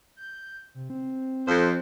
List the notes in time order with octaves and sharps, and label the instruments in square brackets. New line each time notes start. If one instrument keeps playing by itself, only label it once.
[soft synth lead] G6
C3
C4
[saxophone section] F2 C5